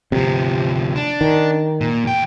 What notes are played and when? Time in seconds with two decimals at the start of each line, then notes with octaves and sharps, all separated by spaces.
0.12 D2 C3 F3
0.96 D4
1.21 D#3
1.81 A#2
2.04 E2 G5